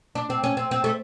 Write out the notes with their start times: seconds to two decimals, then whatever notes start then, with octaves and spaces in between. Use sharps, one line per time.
0.15 D4
0.30 C4
0.44 C#4
0.57 C4
0.71 C4
0.84 A3